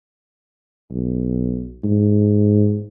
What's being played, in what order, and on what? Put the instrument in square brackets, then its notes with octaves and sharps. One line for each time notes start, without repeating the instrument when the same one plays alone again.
[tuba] B1
G#2